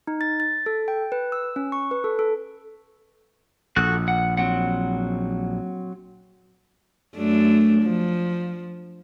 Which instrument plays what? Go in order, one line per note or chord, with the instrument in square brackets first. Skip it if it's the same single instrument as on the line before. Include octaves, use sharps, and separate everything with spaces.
[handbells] D#4
A6
A6
A4
G5
B4
E6
C#4
C#6
B4
A4
A4
[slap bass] A#1 [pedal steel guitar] F#4 A4 F#6
[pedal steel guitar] F#5
F#3 C4 F#5
[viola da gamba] F#2 A3 D4
F3